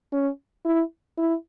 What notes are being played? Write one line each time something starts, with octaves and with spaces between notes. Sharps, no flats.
C#4
E4
E4